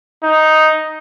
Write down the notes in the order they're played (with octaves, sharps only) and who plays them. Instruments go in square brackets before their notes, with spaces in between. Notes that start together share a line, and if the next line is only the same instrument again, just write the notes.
[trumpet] D#4